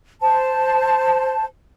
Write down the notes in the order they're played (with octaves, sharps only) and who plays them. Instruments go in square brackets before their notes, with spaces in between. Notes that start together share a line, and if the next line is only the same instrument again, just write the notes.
[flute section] C5 A5